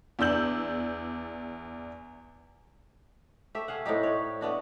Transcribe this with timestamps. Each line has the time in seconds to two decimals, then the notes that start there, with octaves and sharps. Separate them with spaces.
0.19 E2 D4 E6 G6 F#7
3.55 A3 G4 E5
3.68 G#4 F5 F#5
3.86 A2 C4 D#4 G4
4.03 C#5 D5
4.41 A3 B3 D4 F#4